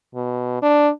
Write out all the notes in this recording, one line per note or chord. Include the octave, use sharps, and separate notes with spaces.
B2
D4